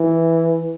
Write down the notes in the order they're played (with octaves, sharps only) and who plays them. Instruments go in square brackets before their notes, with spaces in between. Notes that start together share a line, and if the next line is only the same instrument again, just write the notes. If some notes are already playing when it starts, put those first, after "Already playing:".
Already playing: [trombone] E3